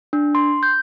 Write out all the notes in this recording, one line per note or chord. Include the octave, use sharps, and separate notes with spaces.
D4
C6
G6